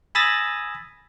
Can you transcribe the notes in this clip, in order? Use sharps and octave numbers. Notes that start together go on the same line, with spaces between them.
G#5 B5 D#6 E6 A6 A#6